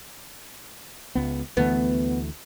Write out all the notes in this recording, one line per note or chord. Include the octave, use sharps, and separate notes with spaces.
C#2 B3
D2 E3 A3 B3